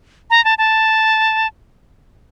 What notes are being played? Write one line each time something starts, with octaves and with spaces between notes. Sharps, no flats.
A#5
A5
A5